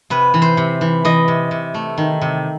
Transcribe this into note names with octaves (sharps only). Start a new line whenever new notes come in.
C3 B4
E3
C5
C3
E3
E3 D#5
C3
C3
A3
D#3
C3